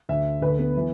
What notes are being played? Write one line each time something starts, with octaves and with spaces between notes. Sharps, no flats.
D2 D3 E5
D2 D3 B4
B3
E3